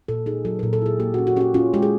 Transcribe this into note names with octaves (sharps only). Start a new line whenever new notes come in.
A#2 A4
D#4 G#4
F#3 A4
A#2 A#4
A4
E4 G#4
A#3 G4
F#4
C#4
F#4
C#4 F#4 G4
C#4 F4
G#3 G4
G#4